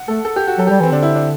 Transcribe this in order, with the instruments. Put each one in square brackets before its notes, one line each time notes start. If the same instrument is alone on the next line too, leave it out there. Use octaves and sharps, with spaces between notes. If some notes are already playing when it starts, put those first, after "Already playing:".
Already playing: [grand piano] F#5
[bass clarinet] A3 [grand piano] A4
[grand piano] A4
G4
F#4
[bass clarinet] F#3 [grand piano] A4
[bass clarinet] G3 [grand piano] G4
[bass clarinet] E3
[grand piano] C4
[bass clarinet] D3 [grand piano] D4
[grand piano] E4
D4